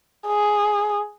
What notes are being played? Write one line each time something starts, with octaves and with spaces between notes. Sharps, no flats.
G#4